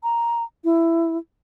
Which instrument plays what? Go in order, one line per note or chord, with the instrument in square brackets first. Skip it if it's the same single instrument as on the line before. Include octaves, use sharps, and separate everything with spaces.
[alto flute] A#5
E4